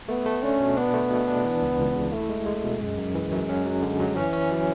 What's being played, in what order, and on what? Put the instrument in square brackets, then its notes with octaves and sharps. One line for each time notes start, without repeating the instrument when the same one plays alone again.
[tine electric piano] A3 [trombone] B3
[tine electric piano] A3
[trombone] C#4 [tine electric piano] D4
[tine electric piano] B2
[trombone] B3 [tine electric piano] D4
[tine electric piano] A3
B2
D4
E3
C#2
C#2
C#3
[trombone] A3 [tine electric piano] E4
[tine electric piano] G#3
G#3
B2
[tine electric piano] F#2 [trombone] G#3
[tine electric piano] F#2
E3
F#2
C#4
F#3
D3
F#3
[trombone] E3 [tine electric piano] C#4
[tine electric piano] C#4
F#3